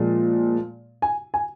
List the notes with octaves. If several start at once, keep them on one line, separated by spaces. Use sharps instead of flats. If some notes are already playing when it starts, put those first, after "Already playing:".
Already playing: A#2 F3 G#3
G#5
G#5